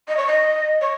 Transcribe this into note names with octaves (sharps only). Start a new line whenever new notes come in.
D#5
C#5
D#5
C#5